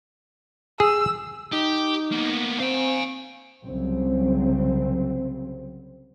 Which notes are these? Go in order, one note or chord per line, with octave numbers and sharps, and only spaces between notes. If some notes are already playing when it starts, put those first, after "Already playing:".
G#4 E6
D#4 G4
A#3 B3
C4 F5 G#5
C2 C#3 F#3 C4